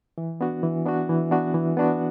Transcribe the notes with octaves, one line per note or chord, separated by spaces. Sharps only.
E3
B3 D4 F#4
E3
B3 D4 F#4
E3
B3 D4 F#4
E3
B3 D4 F#4